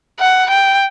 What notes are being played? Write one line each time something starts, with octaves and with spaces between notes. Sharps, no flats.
F#5
G5